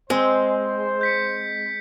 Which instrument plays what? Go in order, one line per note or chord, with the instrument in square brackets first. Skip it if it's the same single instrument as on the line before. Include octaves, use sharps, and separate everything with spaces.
[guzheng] G#3 [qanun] C4 [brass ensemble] C5
[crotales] G6 B6 C#7